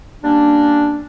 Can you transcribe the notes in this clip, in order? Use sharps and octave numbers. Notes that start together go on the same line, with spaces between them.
G3 A#3 C#4 D4